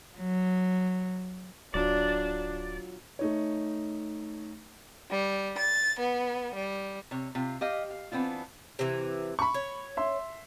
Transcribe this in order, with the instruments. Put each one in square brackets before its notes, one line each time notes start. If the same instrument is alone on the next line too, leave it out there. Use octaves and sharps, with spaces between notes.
[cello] F#3
[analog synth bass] D1 [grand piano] F#3 F4 [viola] D4 [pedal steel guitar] D5
[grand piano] A3 D#4 C#5
[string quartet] G3
A6
B3
G3
[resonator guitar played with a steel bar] C3 C#5
C3 F4
G4 D#5 F5
F5
E3 B3 C4 D4 F4
[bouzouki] C3 E3
[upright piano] B5 C#6
[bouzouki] C#5
[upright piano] E5 C6